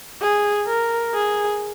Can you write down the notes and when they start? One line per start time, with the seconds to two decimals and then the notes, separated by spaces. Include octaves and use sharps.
0.22 G#4
0.68 A#4
1.15 G#4